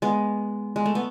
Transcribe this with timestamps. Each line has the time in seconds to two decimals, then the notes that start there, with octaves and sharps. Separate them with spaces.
0.02 G#3 B3
0.76 G#3
0.86 A3
0.95 B3